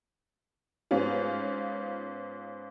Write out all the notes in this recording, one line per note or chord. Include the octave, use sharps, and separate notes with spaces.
G#2 B3 C#4 F4